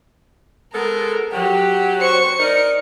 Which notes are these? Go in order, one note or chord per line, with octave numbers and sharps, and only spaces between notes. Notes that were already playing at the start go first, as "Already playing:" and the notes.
G#3 B3 A4 A#4
F#3 G4
C5 C#6 C#7
D#4 A#4 D5